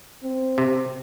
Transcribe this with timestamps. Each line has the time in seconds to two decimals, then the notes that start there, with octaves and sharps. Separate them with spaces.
0.23 C4
0.58 C3